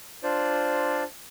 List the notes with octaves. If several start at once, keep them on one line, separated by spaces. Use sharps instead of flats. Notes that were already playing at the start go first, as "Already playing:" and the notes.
D4 F4 C5 D5